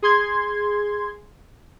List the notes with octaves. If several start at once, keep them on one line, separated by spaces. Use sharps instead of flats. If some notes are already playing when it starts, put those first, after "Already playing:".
G#4 C6 G#6